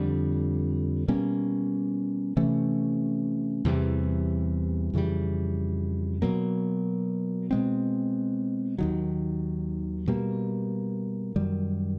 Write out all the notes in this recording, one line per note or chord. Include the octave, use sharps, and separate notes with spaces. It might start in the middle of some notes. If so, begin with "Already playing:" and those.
Already playing: F2 D3 G3
B2 G3 A#3 C#4
C3 E3 A3 C#4
E2 C3 E3 G3
F2 C#3 E3 G3
B2 F#3 A#3
B2 G#3 C4
D#2 D#3 F#3
B2 G3 A#3
F#2 D#3 G3